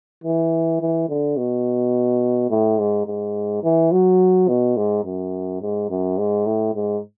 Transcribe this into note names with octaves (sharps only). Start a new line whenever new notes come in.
E3
E3
D3
B2
A2
G#2
G#2
E3
F#3
B2
G#2
F#2
G#2
F#2
G#2
A2
G#2